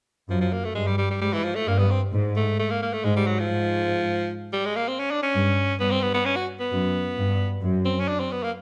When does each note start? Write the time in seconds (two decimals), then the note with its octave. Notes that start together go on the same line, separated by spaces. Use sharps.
0.30 F#2 F3
0.41 F3
0.52 A#3
0.64 A3
0.75 G2 G#3
0.87 G3
0.98 G3
1.10 G3
1.21 G#2 G3
1.33 E3
1.44 F3
1.55 A3
1.67 G2 A#3
1.79 B3
1.91 C4
2.13 G#2
2.36 A3
2.59 A3
2.70 A#3
2.82 A#3
2.93 A3
3.04 G#2 G#3
3.16 G3
3.27 F#3
3.39 F3
3.50 G#2
4.53 G3
4.65 G#3
4.76 A#3
4.88 C4
4.99 C#4
5.11 D4
5.22 C#4
5.34 G2
5.80 G2 B3
5.91 C4
6.02 B3
6.14 B3
6.25 C#4
6.36 F#4
6.60 B3
6.71 F#2
7.17 G2
7.62 F#2
7.85 C4
8.00 C#4
8.08 D4
8.20 C4
8.32 B3
8.43 A#3